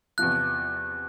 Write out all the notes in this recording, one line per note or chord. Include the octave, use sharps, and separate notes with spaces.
E2 C3 F3 F#6